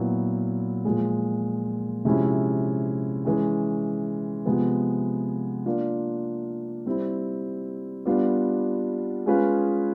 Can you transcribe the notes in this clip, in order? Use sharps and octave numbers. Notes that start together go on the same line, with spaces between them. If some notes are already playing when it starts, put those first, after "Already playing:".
Already playing: A#2 F#3 B3 E4
A#2 F3 G#3
C3 F3 G#3 C#4 E4
E3 G#3 C#4
C3 F3 G#3 B3
A#3 D4 F4
G3 C4 E4
G3 B3 D4 F4
G#3 C#4 F4 G#4 B4